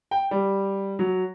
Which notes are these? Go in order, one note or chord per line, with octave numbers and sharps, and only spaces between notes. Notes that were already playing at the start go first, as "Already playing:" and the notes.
G5
G3
F#3